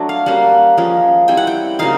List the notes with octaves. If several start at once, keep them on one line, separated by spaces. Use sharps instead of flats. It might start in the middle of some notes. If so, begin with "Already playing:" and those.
Already playing: F#3 A3 D4
F5
G3 A#3 C#4 F#5
F3 G#3 C#4
G3 C4 E4 G5
F#5
G5
C#3 F#3 A#3 D#4 F5